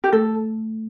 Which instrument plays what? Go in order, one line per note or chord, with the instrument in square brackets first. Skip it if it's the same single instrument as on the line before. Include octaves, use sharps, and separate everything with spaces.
[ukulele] G4
[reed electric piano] A3 [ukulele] A4